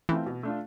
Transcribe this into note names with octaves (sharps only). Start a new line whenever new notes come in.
E3 A3 C4 F4
B2
A3 D4 F4